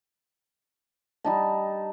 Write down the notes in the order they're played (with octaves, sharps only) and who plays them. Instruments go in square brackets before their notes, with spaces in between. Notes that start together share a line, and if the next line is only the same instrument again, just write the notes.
[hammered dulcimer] G3 D#4 A5